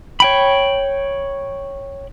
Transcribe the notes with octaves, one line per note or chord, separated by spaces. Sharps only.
C#5 G5 B5